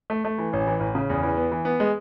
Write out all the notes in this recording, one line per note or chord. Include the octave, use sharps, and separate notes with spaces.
A3
A3
E3
A1
E3
A1
C#3
E2
E3
B3
E3
B3
G#3